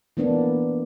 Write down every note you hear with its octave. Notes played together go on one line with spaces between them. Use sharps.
E3 A#3 B3 D4